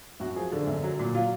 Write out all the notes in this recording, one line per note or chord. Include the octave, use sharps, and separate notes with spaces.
F#2 F#4
F3 G#4
D3
F#2
F#3
A#2
F#3 F4